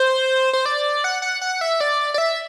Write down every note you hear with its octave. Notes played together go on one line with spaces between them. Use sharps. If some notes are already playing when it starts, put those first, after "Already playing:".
Already playing: C5
C5
D5
F#5
F#5
F#5
E5
D5
D5
E5